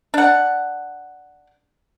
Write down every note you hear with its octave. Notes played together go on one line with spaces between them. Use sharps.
D4 F#5